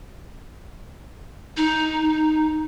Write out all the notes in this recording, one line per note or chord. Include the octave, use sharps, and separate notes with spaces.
D#4